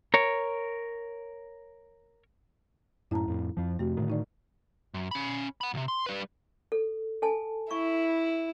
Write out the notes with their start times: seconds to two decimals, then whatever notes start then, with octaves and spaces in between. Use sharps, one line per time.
0.14 A#4 C#5
3.11 F#2 A2 E4 A5 A#5
3.28 F2 A2
3.57 F2 F3
3.79 F2 C3 A3 F#4
3.97 A2 D3 D#3
4.10 D#4 D5
4.94 F#2
5.11 C#4 B5
5.61 F#5 B5
5.74 B1 C3
5.88 C6
6.06 G3 B4
6.72 A4
7.22 A4 G#5 A5
7.71 E4 C#6